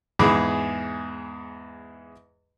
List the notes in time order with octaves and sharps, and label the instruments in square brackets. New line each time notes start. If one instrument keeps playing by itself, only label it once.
[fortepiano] E2 G#2 G#4 B5 D6